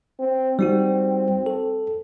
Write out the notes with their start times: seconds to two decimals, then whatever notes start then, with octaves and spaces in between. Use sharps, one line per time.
0.20 C4
0.59 G3 C4 D#4 F#4
1.46 A4